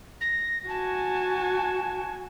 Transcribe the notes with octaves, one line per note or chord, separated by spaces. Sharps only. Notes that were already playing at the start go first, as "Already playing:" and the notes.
A#6
F#4 G#5 A5